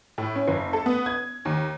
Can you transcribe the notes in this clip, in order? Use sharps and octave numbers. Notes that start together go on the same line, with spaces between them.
A2
C#4
F#1
A4
B3
G#6
D#2